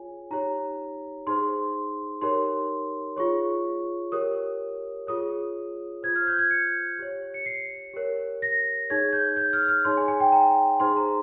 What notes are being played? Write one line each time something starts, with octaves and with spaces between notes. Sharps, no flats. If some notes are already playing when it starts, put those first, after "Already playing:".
Already playing: F4 G#4 C#5 G#5
D#4 G4 C#5 A#5
D#4 G#4 C5 C6
D#4 G4 A#4 C#5 C6
F4 G#4 C#5 C#6
G4 A#4 C#5 D#6
F4 G#4 C#5 D#6
F4 C5 G#6
F6
G6
G#6
C#7
G4 C#5
C#7
C7
G4 A#4 C#5
A#6
D#4 G#4 C#5 G#6
G6
G6
F6
F6
D#4 G#4 C#5 C6
G#5
G#5
G5
A#5
D#4 G#4 C5 C6
A#5